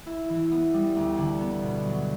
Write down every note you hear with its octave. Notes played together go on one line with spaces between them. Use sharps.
E4
E3
B3
G3
D2
D3
B3
B2
F#3